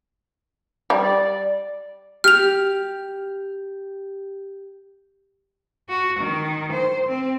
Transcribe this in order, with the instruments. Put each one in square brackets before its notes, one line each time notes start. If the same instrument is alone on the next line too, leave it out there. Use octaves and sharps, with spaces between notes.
[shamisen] G3
[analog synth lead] D5
[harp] G4 [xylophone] F6 F7
[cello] F#4
D#3
C5
C4